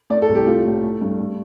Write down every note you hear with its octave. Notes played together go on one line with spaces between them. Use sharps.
A3 D5
A4
C2
G4
A3 F4
A2
A3
G2
A3